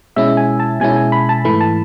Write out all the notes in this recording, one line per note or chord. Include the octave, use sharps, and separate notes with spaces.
B2 G#3 C#4 E4 E5
G#5
A5
B2 G#3 C#4 E4 G#5
G#5
B5
A5
G#2 E3 A3 E4 B5
A5